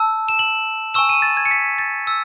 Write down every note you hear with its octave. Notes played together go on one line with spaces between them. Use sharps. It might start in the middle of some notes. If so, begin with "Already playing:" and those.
Already playing: A5 E6
E7
F#7
G#5 C#6 E6 E7
D#7
A6
G#6
C#7
B6
A6
E6